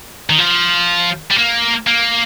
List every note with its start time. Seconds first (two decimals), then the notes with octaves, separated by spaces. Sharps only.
0.30 D#3
0.39 F3
1.31 G3
1.38 A#3
1.87 A#3